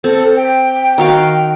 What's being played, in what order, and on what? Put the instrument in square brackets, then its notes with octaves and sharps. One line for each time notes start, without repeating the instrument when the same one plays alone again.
[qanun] C4 [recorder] A4
[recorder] G5
[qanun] D#3 F#4 F5 [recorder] G5